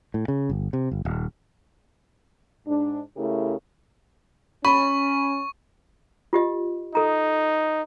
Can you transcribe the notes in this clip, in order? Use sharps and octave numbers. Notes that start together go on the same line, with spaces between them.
A2
C#3
G1
C3
G1
D#1
G#2 D4
C#3 A3 E4 G4 A#4
C#4 B5 C#6
F4 G4 D#5
D#4 A4 A#5